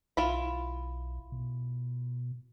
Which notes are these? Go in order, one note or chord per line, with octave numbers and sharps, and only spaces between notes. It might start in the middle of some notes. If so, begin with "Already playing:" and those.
B1 E4 F4 B5
B2